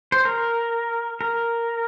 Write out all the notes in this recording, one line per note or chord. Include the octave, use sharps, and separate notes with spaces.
C5
A#4
A#4